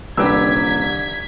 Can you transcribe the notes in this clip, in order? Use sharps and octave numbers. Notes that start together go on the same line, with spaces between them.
D#1 C2 D3 G4 B4 E6 G#6 B6